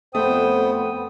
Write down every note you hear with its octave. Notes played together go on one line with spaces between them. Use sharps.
F2 A3 B3 C5 G5 D#6